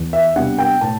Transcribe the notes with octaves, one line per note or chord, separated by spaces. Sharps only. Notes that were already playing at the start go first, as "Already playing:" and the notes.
Already playing: E2
E5
C3 G3 B3 D4 F#5
G5
A2 A5